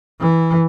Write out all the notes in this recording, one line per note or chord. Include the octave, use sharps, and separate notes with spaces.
E3